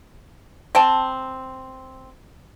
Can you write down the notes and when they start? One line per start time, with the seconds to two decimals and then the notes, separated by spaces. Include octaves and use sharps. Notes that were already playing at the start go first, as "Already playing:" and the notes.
0.75 C4 G5 A5